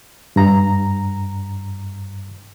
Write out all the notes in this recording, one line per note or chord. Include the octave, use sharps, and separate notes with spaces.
G2 A#5